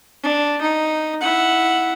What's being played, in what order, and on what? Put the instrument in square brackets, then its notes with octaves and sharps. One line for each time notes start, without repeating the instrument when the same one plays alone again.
[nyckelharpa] D4
D#4
E4 F#5